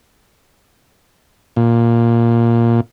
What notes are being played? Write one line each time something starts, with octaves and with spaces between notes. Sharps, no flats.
A#2